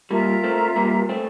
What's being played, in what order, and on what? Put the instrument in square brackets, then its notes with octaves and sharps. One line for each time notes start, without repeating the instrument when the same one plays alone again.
[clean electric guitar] G3 A#3 [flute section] F4 A#4 E5 A#5
[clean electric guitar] A3 C4
G3 A#3
A3 C4